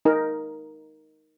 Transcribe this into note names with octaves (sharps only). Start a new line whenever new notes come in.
D#4 A#4